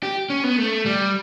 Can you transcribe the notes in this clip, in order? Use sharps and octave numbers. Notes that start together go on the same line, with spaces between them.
G4
C#4
B3
A3
G3